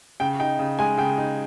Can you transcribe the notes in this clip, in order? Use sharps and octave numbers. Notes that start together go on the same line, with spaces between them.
C#3 G5
D#4 G5
C#3
G#3 G#5
C#3 G5
D#4